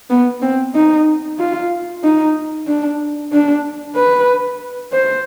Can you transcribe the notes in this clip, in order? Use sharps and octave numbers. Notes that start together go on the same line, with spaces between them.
B3
C4
D#4
F4
D#4
D4
D4
B4
C5